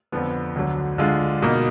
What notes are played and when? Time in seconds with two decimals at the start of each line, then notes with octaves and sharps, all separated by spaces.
0.12 F2 D3 F3 B3
0.55 D2 D3 F#3
0.98 D3 G#3 D4 F4
1.42 B2 A#3 D#4